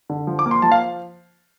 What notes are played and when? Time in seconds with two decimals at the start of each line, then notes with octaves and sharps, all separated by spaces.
0.09 D3
0.27 F3
0.39 D6
0.46 A#3
0.51 C6
0.62 F3 A5
0.72 F5